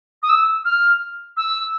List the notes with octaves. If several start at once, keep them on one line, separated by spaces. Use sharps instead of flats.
D#6
E6
F6
E6